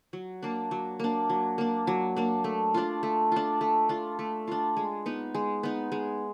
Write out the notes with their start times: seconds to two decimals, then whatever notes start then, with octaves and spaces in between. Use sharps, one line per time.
0.13 F#3
0.43 A#3 D4
0.71 F#3
1.00 A#3 D4
1.30 F#3
1.58 A#3 D4
1.87 F#3
2.16 A#3 D4
2.44 A3
2.74 D4 F4
3.03 A3
3.32 D4 F4
3.61 A3
3.89 D4 F4
4.19 A3
4.47 D4 F4
4.77 G#3
5.06 B3 D#4
5.35 G#3
5.63 B3 D#4
5.92 G#3